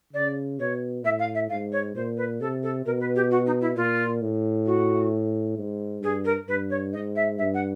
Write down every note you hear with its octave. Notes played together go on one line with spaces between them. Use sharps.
C#3 D5
B2 C#5
A2 E5
F5
E5
G#2 F5
C#5
A#2 C5
B4
C3 A4
A4
B2 A#4
B4
G4
F#4
D#4
E4
A#2 F4
A2
F#4
G#2
G2 G#4
A#4
G2 B4
C#5
G#2 D#5
E5
G2 E5
F#5